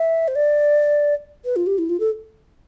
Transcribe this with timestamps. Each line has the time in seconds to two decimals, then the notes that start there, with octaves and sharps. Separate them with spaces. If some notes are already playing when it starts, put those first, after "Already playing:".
Already playing: E5
0.28 C5
0.35 D5
1.45 B4
1.56 F4
1.67 G4
1.78 E4
1.89 F4
2.00 A4